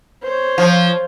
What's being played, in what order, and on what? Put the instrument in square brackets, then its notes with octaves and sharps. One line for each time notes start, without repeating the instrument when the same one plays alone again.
[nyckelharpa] C5 C#5
[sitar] F3